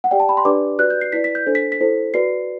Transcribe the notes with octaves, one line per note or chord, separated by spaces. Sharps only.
F#5
G4 D5 G5
A5
B5
C6
D4 G4 B4 D5 D6
F#4 B4 D5 F#6
G6
C7
E4 B4 D5 B6
B6
G6
D4 A4 C5
B6
B6
E4 A4 C5
F#4 B4 D5 C7